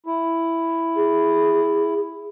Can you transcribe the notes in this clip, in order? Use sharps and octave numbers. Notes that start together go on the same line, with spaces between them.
E4
G#4